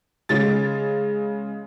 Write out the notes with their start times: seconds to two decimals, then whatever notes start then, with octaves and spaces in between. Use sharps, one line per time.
0.29 C#3 G#3 A6